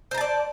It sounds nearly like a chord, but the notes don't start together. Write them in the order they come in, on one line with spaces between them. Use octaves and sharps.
C5 A#5 A5 D5